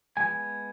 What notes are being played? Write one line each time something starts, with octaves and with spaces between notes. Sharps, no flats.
F3 G#3 B3 G#5